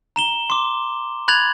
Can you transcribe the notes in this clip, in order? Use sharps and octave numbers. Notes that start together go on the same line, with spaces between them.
A#5 E7 G7
C6 D6
B5 F#6 G#6 A6 F7 F#7